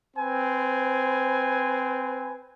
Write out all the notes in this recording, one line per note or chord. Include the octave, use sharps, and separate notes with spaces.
C4 B4 C5 G#5